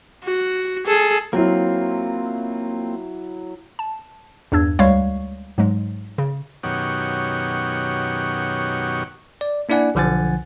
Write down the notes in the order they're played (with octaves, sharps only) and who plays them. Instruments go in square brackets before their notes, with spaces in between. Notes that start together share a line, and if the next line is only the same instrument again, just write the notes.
[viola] F#4
G#4 A4
[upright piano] F#3 E4 [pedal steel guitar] A#3 C4 F4
[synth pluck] A5
E2 G2 D4 E6 G#6
D2 G3 G#3 C#5 F5 C#6
G#2 F#3 G#3
C#3
[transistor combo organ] F#2 B2 D#3 G4 C#5 F#5
[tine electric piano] D5
A#3 D4 E4 D5 F#5 G#5
B1 D3 F3 F#5 G#5 A6